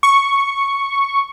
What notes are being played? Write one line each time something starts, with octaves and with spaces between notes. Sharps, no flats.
C#6